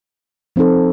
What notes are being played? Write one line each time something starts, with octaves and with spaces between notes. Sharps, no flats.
F3 C4 D#4 A4